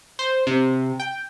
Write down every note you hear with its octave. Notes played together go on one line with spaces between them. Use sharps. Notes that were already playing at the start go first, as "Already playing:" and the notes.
C5
C3
G5